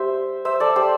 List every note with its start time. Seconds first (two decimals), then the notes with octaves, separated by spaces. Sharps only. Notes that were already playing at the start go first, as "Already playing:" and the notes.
Already playing: G3 C5 E5
0.45 C5 E5
0.60 A4 D5
0.76 G4 C5